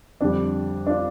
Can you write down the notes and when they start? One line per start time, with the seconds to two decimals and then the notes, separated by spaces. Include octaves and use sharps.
0.21 F2 D3 G3 D4
0.87 D4
0.90 F4